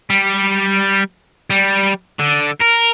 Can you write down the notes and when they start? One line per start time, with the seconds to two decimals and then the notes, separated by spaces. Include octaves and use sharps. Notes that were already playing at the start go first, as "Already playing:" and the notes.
0.10 G3
1.50 G3
2.20 D3
2.61 A#4